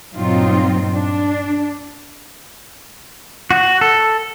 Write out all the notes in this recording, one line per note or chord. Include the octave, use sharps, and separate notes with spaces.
G2 A#2 F#3 C4 D#4 F4
D4
F#4
A4